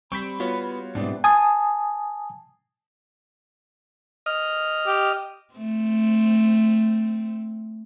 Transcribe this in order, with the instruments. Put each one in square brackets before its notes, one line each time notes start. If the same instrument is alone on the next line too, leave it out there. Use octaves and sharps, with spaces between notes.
[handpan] G3 [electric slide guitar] C4 [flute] B5 [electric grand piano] C#6 G6 B6
[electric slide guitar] B3 [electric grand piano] F4 F#4 C#5
[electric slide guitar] G#2 B2 [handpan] G3 E4 D5 [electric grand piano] B3 C4 D4
[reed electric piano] G#5 A5 D#6
[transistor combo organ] D#5 F6
[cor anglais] G4
[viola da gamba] A3 C4